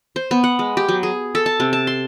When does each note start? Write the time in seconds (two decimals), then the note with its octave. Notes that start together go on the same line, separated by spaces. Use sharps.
0.16 C5
0.31 B3
0.44 F#5
0.59 G#3
0.77 G4
0.89 F#3
1.03 G#4
1.35 A4
1.46 A5
1.60 C3
1.73 A5
1.87 C6